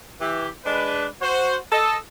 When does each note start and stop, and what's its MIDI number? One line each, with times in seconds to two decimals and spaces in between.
0.20 0.47 52
0.20 0.47 67
0.65 1.06 56
0.65 1.06 62
0.65 1.06 71
1.22 1.56 66
1.22 1.56 72
1.72 1.95 69
1.72 1.95 75